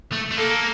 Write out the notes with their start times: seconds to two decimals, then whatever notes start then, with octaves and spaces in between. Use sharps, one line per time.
0.12 A3
0.31 A3
0.37 A#3 A4